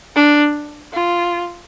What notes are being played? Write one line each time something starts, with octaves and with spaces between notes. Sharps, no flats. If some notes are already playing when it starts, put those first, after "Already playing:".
D4
F4